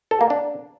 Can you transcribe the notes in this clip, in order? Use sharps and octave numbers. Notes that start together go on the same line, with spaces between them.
A4
A#3
D4